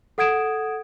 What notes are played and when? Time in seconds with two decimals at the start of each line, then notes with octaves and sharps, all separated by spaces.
0.18 A4 F#5 D#6 G#6 D7 E7